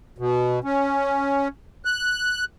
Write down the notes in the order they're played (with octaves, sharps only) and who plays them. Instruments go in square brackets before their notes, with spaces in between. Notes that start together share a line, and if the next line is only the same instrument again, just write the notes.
[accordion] B2
C#4
F#6